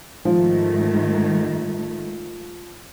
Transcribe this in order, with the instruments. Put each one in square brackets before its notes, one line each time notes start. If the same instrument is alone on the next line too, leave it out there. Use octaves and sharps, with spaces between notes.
[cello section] G#2 D#3 A3 [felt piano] F3